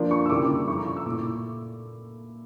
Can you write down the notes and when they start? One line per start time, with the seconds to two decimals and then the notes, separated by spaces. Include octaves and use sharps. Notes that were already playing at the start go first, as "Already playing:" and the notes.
Already playing: F3 A#3 D4
0.11 C#6
0.26 E6
0.30 C#3 G3 A#3 E4 D6
0.68 F3 A3 E4 C#6
0.77 A#5
0.87 C#6
0.96 E6
1.06 A#2 A3 E4 D6